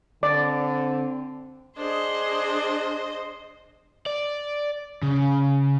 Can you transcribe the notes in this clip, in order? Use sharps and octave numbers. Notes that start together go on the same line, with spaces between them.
D3 C4 D5
D4 G#4 C5 D#5
D5
C#3